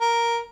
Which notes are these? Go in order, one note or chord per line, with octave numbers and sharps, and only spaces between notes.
A#4